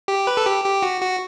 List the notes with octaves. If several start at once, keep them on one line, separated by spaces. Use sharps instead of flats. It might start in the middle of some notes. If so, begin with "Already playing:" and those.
G4
B4
A4
G4
G4
F#4
F#4